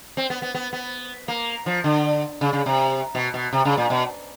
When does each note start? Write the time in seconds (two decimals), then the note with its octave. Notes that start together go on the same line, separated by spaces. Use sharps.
0.17 C4
0.30 B3
0.42 B3
0.55 B3
0.73 B3
1.28 A#3
1.66 F3
1.84 D3
2.41 C#3
2.53 C#3
2.66 C3
3.15 B2
3.34 B2
3.53 C3
3.65 C#3
3.77 A#2
3.90 B2